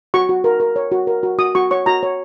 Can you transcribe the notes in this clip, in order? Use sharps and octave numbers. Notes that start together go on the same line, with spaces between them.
F#4 C#6
F#4
A#4
A#4
C#5
F#4
A#4
F#4
F#4 D#6
F#4 C#6
C#5 C#6
F#4 A#5
C#5